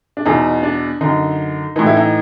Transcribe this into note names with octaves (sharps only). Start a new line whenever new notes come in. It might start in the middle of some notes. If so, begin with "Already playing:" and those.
D4
E2 B2 D#4
D4
F#2 D3 D#4
A2 E3 D#4
E4
D#4